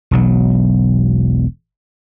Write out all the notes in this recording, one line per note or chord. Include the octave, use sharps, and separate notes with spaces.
E1 B1 F#3